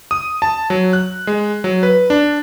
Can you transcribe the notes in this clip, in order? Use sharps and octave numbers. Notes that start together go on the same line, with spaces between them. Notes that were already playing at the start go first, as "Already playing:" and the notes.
D#6
A5
F#3
F#6
G#3
F#3
B4
D4